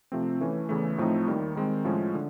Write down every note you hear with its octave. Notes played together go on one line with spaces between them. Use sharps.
C3 F3 A3 C4
E3 A3 C#4
E2 C#3 E3 A3
A2 F3 A3 C4 D#4
D#2 D#3 G3
D#3 G#3 C4
A2 F3 G#3 C#4
D3